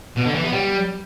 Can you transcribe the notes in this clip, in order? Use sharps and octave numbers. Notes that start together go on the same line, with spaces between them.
B2
D3
E3
B3
G3